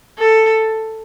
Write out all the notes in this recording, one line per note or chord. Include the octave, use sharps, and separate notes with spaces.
A4